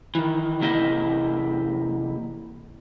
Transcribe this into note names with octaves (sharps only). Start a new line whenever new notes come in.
D#3 E3
E2 C3 A#3 E4 G4 D#5